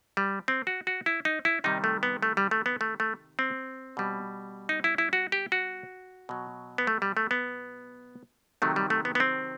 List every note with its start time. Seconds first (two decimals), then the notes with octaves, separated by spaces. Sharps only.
0.17 G3
0.48 C4
0.67 F#4
0.87 F#4
1.06 E4
1.25 D#4
1.45 E4
1.64 C3 D#3 G3 D#4
1.84 A3
2.03 B3
2.22 A3
2.37 G3
2.51 A3
2.66 B3
2.81 A3
3.00 A3
3.39 C4
3.97 B2 G3
4.69 D#4
4.84 E4
4.98 E4
5.13 F#4
5.32 G4
5.52 F#4
6.29 B2 F#3
6.78 B3
6.87 A3
7.02 G3
7.17 A3
7.31 B3
8.62 C3 D#3 F#3 A3
8.76 G3
8.90 A3
9.05 B3
9.15 B3
9.20 C4